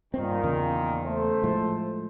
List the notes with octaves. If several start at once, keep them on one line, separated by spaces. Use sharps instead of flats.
G2 A#2 D#3 C4
E2 C#3 A#3
A3 C5
A2 F3 G#3